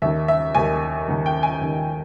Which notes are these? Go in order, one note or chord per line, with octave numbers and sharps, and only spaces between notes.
D#2 D#3 E5
E5
D#2 D#3 G#5
D#2 D#3
G5
G#5
D#2 D#3